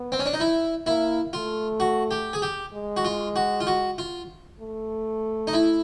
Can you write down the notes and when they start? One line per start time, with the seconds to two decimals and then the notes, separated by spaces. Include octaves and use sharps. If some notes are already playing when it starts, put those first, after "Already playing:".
Already playing: B3
0.12 C4
0.19 C#4
0.26 D4
0.33 D#4
0.40 E4
0.86 A#3 E4
1.33 A3 F4
1.80 F#4
2.11 G4
2.33 G#4
2.42 G4
2.74 G#3
2.97 F#4
3.05 F4
3.36 F#4
3.60 F4
3.67 F#4
3.98 F4
4.60 A3
5.47 D#4
5.53 E4